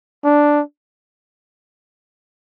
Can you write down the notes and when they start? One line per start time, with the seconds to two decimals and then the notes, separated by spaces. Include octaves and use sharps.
0.24 D4